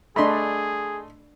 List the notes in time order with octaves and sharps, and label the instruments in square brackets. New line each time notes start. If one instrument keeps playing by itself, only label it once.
[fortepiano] A3 D#5 C6 [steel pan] D4 B5 [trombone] G#4